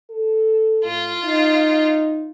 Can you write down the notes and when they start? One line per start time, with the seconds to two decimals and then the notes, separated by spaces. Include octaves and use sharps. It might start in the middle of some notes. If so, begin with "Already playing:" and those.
0.10 A4
0.84 A2 F4
1.25 D#4